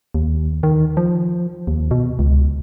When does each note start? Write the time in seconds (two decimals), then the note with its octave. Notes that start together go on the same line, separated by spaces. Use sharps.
0.15 D#2
0.63 D#3
0.97 F3
1.67 D#2
1.91 B2
2.19 C#2